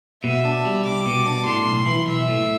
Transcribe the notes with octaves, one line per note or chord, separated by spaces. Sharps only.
B2 E5
D4
G3
C2 D6
B2
D4
A2 C6
B1
E3
B1 E5
A2